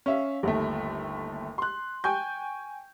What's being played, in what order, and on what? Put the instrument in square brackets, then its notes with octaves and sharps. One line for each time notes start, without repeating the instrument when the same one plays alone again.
[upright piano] C#4 E5 F5
G1 D#2 A3
C6 F#6
G5 G#5 C#6 G6